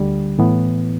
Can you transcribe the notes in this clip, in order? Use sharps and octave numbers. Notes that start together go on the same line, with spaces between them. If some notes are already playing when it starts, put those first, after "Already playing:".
Already playing: D2 D3 G3
A2 E3 B3